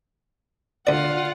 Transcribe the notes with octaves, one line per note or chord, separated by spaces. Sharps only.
D2 F4 D5 F#5